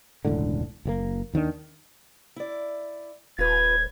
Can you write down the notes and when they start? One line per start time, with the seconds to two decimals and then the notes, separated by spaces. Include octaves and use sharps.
0.25 E1 C#2 A2 D3
0.85 F#1 A#2 A#3
1.34 D#2 D#3 A3 D4
2.36 E4 D5
3.39 D#1 F4 B4 G#6